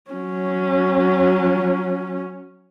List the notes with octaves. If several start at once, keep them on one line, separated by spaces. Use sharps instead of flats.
F#3 C#4